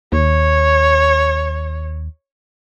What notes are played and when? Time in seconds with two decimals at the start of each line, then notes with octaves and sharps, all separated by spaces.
0.12 D#2 C#5